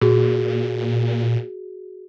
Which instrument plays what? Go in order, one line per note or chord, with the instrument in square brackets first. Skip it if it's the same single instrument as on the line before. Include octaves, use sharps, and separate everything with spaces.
[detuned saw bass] A#2 [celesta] F#4 G#4